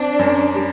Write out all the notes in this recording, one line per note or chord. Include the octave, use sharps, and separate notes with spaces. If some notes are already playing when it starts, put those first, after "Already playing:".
Already playing: C4 D4
F#2
G3